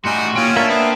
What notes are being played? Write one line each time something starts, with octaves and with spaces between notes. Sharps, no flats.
A2 G3 D#4 F#4 G#5 C6
A#3 C#4 F4 G5
A#3 D4 E5
B3 C4